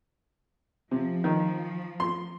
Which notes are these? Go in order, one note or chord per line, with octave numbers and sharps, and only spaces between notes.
C3 F3
D#3
C6